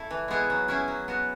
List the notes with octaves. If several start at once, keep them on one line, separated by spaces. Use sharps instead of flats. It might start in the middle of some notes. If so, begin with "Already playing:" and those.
Already playing: A3 E4
E3
G#3 B3 E4 G#4
F#3
C#4 E4 G#4
F#3
B3 F#4